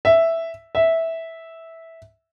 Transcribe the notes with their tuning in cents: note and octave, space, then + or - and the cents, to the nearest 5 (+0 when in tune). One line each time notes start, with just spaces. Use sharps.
E5 +0
E5 -10